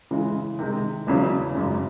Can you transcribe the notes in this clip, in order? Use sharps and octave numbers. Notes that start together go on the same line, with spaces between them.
C#3 E3 G#3
C3 D#3 G#3 D#4
E1 E2 C#3 F#3
G#1 F#2 C#3